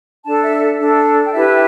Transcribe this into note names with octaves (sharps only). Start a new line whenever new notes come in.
D4 A4 A5
E5
D4 A4
G5
E4 G4 B4 E5